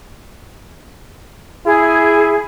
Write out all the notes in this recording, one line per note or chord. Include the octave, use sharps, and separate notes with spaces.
E4 G#4